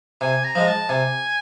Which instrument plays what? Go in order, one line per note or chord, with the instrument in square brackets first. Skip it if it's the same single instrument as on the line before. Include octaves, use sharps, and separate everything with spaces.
[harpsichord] C3 [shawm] G#5
[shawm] A#5
[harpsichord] F3 G#3
[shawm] A5
[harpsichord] C3 [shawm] G#5